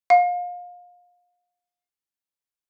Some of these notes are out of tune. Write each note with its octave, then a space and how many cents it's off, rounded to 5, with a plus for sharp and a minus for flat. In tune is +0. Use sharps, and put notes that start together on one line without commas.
F5 +30